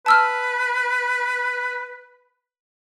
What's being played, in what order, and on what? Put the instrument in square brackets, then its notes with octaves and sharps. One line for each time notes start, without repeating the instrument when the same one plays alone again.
[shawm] B4 [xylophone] A5 E6 F6